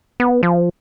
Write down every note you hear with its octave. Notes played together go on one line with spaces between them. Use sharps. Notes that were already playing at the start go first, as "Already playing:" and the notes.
B3
F3